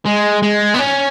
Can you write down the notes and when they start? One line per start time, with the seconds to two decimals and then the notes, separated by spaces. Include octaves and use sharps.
0.05 G#3
0.42 G#3
0.75 B3
0.79 C#4